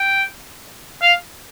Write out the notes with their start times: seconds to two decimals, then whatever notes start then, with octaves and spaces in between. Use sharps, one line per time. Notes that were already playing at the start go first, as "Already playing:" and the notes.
Already playing: G5
1.02 F5